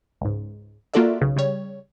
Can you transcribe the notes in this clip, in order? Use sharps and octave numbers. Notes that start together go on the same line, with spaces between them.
C#2 G#2
A#3 F4 F#4 A4 D5 E5
B1 C#3
C#3 G3 C#5